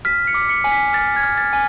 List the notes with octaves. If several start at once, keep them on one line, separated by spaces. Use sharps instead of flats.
F6 B6
C#7
D6
C#7
G#5
B6
F6 A6
G#6
F6
A6
G#5